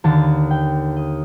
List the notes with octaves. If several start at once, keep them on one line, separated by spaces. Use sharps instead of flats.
D#2 D3 A5
G5
D#5